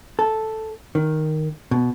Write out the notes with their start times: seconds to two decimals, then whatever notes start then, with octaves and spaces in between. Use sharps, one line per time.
0.19 A4
0.95 D#3
1.71 B2